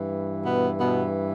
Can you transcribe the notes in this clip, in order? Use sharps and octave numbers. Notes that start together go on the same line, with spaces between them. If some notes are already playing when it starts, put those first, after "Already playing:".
Already playing: G2 E3
B2 B3
B2 B3